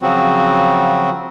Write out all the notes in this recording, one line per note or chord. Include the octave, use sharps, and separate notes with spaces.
C#3 F3 F#3 C4 F#4